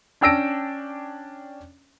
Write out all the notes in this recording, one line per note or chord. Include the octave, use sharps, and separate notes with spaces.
C#4 D4 G5 E6 A#6 D7